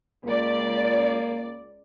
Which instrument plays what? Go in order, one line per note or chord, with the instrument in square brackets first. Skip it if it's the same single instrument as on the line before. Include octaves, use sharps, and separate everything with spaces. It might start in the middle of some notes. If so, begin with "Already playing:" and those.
[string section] C#2 D5 [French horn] A#3